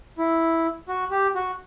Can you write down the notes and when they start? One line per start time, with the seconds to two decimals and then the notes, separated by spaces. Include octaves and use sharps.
0.18 E4
0.88 F#4
1.11 G4
1.35 F#4